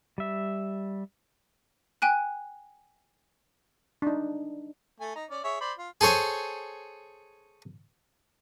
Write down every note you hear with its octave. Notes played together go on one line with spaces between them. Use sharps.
G3 E5
G5 G#5 F#6
D4 D#4
A3 G#5
D#4 A#5
C#4 D5
G#4 C#5 E5
C5 D5 B5
F4
G#4 A4 C5 C#5 G#5